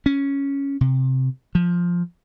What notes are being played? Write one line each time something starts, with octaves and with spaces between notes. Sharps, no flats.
C#4
C3
F3